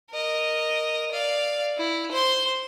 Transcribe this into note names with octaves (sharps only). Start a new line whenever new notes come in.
A#4 D#5
D5 F5
E4
C5 C6